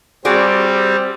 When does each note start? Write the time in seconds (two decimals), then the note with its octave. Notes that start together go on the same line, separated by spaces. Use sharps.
0.25 G3 C4 F#4 G#4 D5